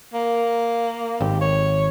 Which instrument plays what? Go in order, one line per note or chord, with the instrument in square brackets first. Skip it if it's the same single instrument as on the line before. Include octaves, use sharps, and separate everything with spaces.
[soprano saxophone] A#3
[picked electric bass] G#1 [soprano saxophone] G4
[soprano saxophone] C#5